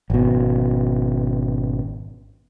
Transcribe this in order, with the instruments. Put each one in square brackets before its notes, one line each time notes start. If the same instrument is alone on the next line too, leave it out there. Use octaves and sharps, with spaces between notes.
[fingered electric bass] G#1 B2